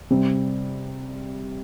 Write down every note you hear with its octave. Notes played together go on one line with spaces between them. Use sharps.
C3 G3 C4